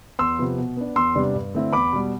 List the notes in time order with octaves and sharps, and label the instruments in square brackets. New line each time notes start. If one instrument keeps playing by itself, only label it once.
[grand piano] E2 C6 E6
C3 F3 B3
B2
B3 D4
E2 C6 E6
C3 G3 B3 D4
G2
D3 A3 C4 E4
E2 B5 D6
B2 G3